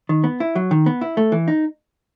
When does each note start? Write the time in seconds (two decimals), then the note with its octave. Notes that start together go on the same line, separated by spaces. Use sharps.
0.09 D#3
0.24 B3
0.40 E4
0.55 F#3
0.71 D#3
0.86 B3
1.01 E4
1.17 A3
1.32 E3
1.48 D#4